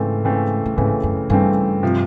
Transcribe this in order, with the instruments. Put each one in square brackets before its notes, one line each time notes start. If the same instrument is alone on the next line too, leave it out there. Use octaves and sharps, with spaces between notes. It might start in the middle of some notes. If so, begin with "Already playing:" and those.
Already playing: [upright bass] G#2 [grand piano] C#3 E3 A3 C4
[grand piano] C#3 E3 A3 C4
[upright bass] A2
[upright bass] G#2 [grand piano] C#3 E3 A3 C4
[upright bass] F#2
[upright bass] G2 [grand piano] C#3 E3 A3 C4
[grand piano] C3 F3